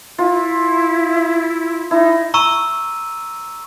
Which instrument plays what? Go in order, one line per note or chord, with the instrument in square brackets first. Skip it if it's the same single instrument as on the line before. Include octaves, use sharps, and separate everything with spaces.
[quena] E4 [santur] F4
[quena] D#4 [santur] E4
[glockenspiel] A#5 C#6 E6 D#7